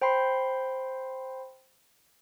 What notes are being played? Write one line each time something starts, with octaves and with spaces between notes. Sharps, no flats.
C5 G5 B5 C6 C7